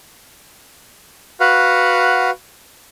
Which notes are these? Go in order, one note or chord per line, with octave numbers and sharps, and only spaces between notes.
F#4 B4 F5 F#5